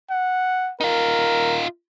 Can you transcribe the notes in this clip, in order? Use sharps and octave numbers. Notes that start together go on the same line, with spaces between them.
F#5
D#4 F4 A#4